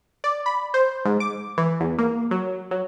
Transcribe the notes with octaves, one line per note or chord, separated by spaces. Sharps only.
D5
B5
C5
G#2
D6
E3
E2
A#3
F#3
F#3